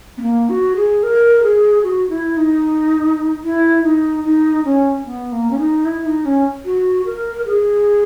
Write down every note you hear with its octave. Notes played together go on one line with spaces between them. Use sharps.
B3
A#3
F#4
G#4
A#4
G#4
F#4
E4
D#4
E4
D#4
D#4
C#4
B3
A#3
C#4
D#4
E4
D#4
C#4
F#4
A#4
G#4